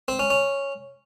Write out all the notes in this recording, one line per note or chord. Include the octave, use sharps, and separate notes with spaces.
C4
C#4
C#4